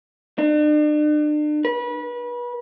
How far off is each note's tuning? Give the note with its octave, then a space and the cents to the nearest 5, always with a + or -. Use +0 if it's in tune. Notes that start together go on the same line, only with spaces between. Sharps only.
D4 +40
B4 -30